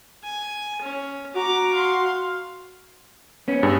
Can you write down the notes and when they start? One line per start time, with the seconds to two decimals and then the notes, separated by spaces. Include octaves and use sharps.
0.24 G#5
0.82 C#4
1.36 F#4 A#5 D6
1.74 F5 C6
3.48 B3 C#4
3.63 G2 G#4